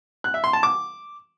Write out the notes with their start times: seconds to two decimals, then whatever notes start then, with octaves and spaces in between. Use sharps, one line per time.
0.24 F#6
0.34 E5
0.44 C6
0.53 A5
0.63 D6